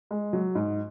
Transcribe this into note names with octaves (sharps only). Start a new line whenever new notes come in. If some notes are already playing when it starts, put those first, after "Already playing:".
G#3
F#3
G#2